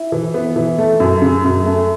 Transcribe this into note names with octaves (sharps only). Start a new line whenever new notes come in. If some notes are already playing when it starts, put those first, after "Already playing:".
Already playing: E4
E3
B3
E3
A3
F#2
C#3
F#2
A3